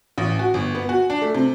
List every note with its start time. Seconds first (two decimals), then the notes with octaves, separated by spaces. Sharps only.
0.18 A1
0.39 F#4
0.54 G1
0.75 B3
0.89 F#4
1.10 D4
1.22 A3
1.35 C3